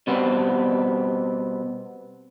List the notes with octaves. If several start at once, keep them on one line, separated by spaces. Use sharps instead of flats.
B2 G3 B3 C4